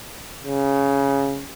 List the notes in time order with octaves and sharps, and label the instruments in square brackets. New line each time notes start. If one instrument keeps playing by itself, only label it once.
[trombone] C#3